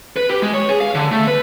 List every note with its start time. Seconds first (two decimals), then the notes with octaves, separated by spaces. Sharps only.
0.17 B4
0.29 G4
0.42 G#3
0.54 C#5
0.69 G#4
0.81 F5
0.95 D3
1.12 A3
1.27 B4